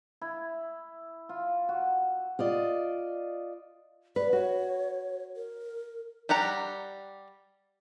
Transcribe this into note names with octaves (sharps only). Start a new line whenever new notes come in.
E4
F4
F#4
F4 D5 D#5
B4 D5
F#4 C#5
A#4
G3 G4 F#5 A#5